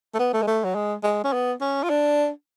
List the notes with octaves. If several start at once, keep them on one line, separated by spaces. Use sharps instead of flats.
A3
B3
A3
G#3
A3
F#3
G#3
G#3
C#4
B3
C#4
F4
D4